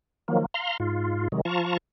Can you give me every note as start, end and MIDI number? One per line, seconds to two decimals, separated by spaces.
0.28 0.46 51
0.28 0.46 53
0.28 0.46 54
0.28 0.46 58
0.54 0.77 77
0.54 0.77 82
0.54 0.77 84
0.80 1.28 44
0.80 1.28 65
1.32 1.41 48
1.32 1.41 51
1.32 1.41 54
1.32 1.41 56
1.45 1.77 53
1.45 1.77 65
1.45 1.77 81
1.45 1.77 82
1.45 1.77 85